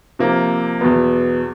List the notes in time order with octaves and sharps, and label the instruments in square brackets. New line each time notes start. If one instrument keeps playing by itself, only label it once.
[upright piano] C3 F3 A#3
E2 B2 F#3 B3